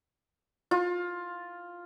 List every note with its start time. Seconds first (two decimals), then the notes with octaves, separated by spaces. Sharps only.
0.71 F4